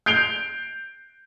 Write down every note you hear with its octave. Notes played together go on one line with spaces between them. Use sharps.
G6 C7 D7 F7 G7